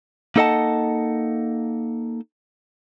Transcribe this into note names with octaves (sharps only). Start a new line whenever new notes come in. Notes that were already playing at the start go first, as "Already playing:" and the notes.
A#3 D#4 A4 D#5 F#5 A5